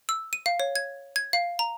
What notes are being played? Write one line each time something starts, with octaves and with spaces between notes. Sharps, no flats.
E6
D#7
F5
C#5
G#6
G#6
F5
A#5